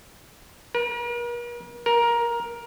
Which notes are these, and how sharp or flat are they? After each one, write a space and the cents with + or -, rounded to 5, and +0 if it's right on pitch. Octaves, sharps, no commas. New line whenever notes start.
A#4 +45
A#4 +15